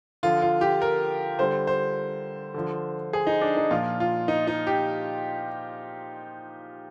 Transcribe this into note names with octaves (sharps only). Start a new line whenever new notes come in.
D3 F3 F4
F4
G4
A#4
D3 G3 C5
C5
D3 F3
G#4
D#4
D4
D#4
A#2 F3 F4
F4
D#4
D#4
G4